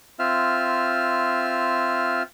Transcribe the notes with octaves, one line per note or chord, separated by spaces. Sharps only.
C4 F4 E5 F6